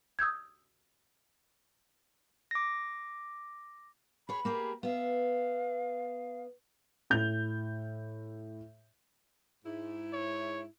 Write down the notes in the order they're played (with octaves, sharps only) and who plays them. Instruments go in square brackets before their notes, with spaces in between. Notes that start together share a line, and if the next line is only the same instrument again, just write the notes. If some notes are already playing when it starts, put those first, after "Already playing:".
[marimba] D#6 E6 G6 G#6
[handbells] D6 A#6
[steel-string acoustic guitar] G#4 C#5 [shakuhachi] B5
[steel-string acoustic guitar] A#3 G4 G#4
[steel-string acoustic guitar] B3 E5 [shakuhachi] F5
[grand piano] A2 G6 F7
[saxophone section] G#2 E4
[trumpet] C#5